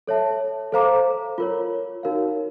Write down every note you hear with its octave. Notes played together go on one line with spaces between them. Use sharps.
A4 C#5 E5 A5
A4 C5 F5 A#5 D6
F4 A#4 C#5
D#4 F#4 A#4 C#5 F5